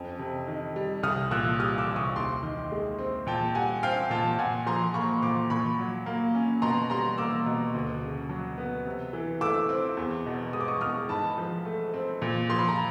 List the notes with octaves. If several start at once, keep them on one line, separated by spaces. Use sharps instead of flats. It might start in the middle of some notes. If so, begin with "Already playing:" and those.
Already playing: F2 C#4
C3
D#3
G3
C2 D#6 F6
A#2 E6 F#6
G3 D#6 F6
D6 E6
C2
C#6 D#6
D#2 C6 D6
D#3
G#3
C4
A#2 G5 A5
G3 F#5 G#5
C4 F5 G5
A#2 G5 A5
A#2 F#5 G#5
F3 A#5 C6
A#3 B5 C#6
A#2 C6 D6
A#2 B5 C#6
F#3
A#3
C#4
B2 A#5 C6
G3 A#5 C6
A#3 D6 E6
B2
D2
C#3
F#3
B3
C3
E3
A3 D6 E6
C4
E2
B2
G#3 D#6
D6
C#6 D#6
E2 D#6 F6
G#2 A5 B5
F3
A3
C4
A#2
F3 C6
B5
A#5